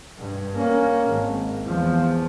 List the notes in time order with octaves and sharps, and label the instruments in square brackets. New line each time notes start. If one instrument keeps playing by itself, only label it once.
[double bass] G2
A#3 C#4
G#1
E2 F3